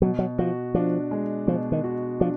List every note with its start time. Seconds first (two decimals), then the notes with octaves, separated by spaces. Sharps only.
0.02 B2 F#3
0.19 F#3
0.38 F3 F#4
0.74 F3 D4
1.11 G#3
1.47 B2 F3
1.72 D#3
1.84 F#4
2.20 F3 D4